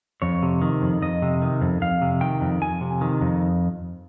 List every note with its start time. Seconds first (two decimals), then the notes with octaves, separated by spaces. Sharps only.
0.22 F2 C#5
0.43 C3
0.62 D#3
0.82 F2
1.02 F2 D#5
1.22 C3
1.42 D#3
1.61 F2
1.81 F2 F5
2.02 C3
2.21 D#3 G5
2.41 F2
2.62 F2 G#5
2.81 C3
3.01 D#3
3.21 F2